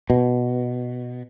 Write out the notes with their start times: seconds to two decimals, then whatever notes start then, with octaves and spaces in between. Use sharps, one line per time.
0.10 B2